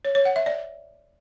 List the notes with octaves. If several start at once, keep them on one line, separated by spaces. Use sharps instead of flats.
C#5
C#5
F#5
E5
D5